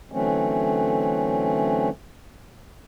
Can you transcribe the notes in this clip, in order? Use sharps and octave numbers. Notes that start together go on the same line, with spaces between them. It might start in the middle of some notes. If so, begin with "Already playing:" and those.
D3 E3 F#3 A3 C4 C#4